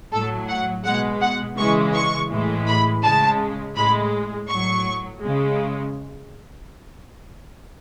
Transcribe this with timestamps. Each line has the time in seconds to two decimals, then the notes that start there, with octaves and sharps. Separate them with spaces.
0.12 A2 F#3 A4
0.48 F#5
0.84 B2 G#3 F#5
1.21 F#5
1.57 C#3 E3 G#3 C#6
1.94 C#6
2.30 A2 E3 G#3
2.67 B5
3.03 C#3 G#3 A5
3.76 A2 G#3 B5
4.49 A2 F#3 C#6
5.21 C#3 G#3